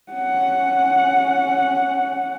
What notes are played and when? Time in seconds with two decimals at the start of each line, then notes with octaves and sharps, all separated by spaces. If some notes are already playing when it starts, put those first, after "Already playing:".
0.12 C#4 F#5